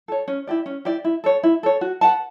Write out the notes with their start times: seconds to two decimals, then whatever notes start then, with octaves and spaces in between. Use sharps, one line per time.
0.08 A4 C#5
0.28 C#4
0.47 E4 G4 D5
0.66 C#4
0.85 E4 G4 D5
1.04 E4
1.24 A4 C#5
1.43 E4
1.63 A4 C#5
1.81 F#4
2.01 B4 F#5 A5